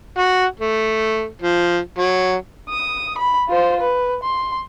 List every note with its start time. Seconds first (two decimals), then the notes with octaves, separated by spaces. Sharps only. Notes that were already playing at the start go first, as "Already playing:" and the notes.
0.18 F#4
0.60 A3
1.42 F3
1.99 F#3
2.69 D#6
3.18 B5
3.48 F4 C5
3.80 B4
4.23 C6